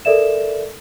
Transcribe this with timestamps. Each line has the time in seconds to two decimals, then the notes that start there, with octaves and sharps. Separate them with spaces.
0.05 A4 A#4 D5 E5 E7